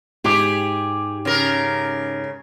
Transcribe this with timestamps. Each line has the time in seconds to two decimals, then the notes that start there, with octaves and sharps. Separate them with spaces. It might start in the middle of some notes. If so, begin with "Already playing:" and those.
0.24 G#2 G4 G#4 D6
1.25 C#3 A#4